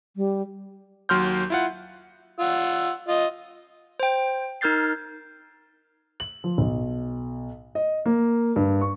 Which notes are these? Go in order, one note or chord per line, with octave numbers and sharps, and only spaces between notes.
G3
D#2 F#3 C6 F6 G6
E4 F4 F#5
F4 F#5 E6
F4 D#5
C5 G5
D#4 A#4 F6 G6 A6 C7
F#7
F3
B1
D#5
A#3
G2
C#6